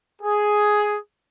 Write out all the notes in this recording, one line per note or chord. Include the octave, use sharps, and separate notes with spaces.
G#4